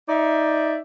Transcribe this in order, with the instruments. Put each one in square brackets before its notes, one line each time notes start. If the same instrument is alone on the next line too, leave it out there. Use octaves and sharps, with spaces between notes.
[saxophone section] D#4 D5 E5